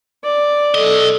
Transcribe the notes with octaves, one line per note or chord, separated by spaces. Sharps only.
D5
B1 A4 D#5